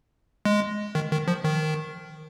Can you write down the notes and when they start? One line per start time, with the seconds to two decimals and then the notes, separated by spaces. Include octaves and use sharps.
0.45 G#3
0.95 D#3
1.12 D#3
1.28 F3
1.44 D#3